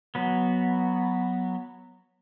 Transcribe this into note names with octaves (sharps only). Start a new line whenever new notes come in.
F#3 B3